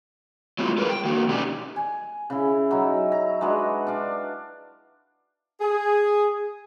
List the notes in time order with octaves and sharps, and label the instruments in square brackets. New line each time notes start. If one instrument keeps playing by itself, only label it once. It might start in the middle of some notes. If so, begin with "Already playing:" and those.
[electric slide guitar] F#3 G#3 B3 E4 F4
G3 G#4 A#4 B4
G5
D#3 A#3 F#4
B2 C#4 D#4 G4 D5 G#5
[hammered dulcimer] G#5
C#3 E4
F#3 D#4 E4
A#5
G#3 D4 F#4 B4
D4 F5
[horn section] G#4